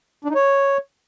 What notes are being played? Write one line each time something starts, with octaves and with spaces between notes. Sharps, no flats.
D4
D#4
C#5